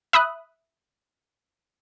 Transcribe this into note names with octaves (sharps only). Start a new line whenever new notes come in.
E5 B5 D#6 F#6